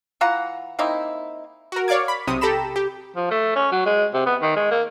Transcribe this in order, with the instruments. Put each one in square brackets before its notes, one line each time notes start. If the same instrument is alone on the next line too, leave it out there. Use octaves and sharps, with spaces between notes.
[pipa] E3 F4 F#5 A#5
A#3 C4 D#4 E4
[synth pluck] F#4 A#4
C#5 D5 F5 D6 G#6
B5
B1 C3 D#6
G4 A4 A#5 B5 E7
G4
[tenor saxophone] F3
A3
C#4
F#3
G#3
C3
B3
D#3
G#3
A#3